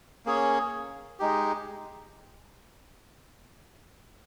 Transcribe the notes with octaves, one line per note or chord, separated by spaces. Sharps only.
A#3 C#4 G#4 C#5
G#3 D#4 G4